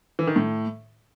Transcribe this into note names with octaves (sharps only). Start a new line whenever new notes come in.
E3
D#3
A2